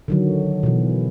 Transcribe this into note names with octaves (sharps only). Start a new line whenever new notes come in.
D3 D#3 F#3
B2 E3